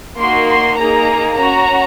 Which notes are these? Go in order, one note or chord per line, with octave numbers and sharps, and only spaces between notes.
A#3 D#4 F#4 C6
C6
A#3 D#4 G#4 A#5
C#4 F#4 A#5